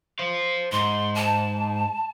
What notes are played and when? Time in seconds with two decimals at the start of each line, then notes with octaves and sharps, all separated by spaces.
0.19 C5 F5
0.72 G#2 C6
1.15 A5